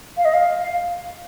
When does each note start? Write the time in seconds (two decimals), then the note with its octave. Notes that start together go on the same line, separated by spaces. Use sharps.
0.17 F5
0.25 D#5
0.34 F5